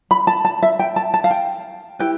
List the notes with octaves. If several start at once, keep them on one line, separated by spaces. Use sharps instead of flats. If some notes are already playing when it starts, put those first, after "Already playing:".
B5
A5
A5
E5
G5
A5
A5
F5
G5
E4 G4 B4 G5